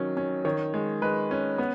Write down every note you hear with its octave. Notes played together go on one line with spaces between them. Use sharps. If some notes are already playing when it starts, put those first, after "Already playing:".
Already playing: D#3 F#3 C#4
C#4
D#3 C#5
G#3
G#3 B4
C#4
B3